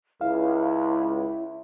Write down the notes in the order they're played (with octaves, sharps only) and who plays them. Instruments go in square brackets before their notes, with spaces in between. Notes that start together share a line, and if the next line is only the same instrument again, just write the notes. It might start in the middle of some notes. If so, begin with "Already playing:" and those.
[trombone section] C#2 [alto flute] E4 [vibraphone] E5 [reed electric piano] F5